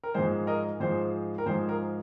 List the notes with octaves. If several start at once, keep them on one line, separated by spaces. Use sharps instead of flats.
A#4
G#2 F3 G#3 C5
A#4 D#5
G#2 F3 G#3 C5
A#4
G#2 F3 G#3 C5
A#4